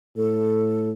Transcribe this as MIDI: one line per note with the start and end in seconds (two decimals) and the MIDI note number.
0.17 0.93 45
0.17 0.90 69